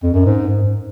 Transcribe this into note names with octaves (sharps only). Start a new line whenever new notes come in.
F2
F#2
G#2